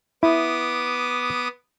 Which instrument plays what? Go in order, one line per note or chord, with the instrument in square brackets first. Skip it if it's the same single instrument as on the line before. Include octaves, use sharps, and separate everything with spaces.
[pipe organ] B3 D6 D#6 [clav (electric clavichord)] E4